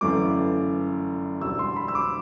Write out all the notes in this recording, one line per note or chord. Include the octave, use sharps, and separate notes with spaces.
G1 F#2 E3 A3 D6
E1 D2 D3 G3 E6
C6
B5
E6
D6